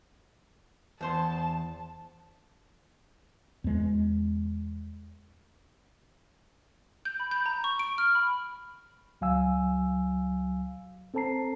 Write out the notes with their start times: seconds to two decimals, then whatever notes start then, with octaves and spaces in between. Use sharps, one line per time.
1.01 E2 C5 A5 C6
3.64 E2 G#3
7.05 G6
7.20 B5
7.31 G6
7.46 A#5
7.64 C#6
7.79 D7
7.98 F6
8.15 B5
9.21 C#2 F#3 F5 G#5 E6
11.14 C4 A4 C5 A5 A#5 C7